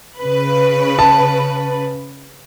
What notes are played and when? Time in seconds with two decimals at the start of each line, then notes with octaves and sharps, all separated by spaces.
0.19 C#3 B4
0.99 A5